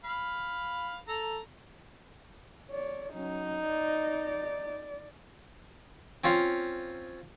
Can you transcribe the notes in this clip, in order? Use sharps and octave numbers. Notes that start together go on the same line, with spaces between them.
F5 B5
A4 A#5
C#5 D5
F#3 C#4 D#4
D5
C4 C#4 F4 C5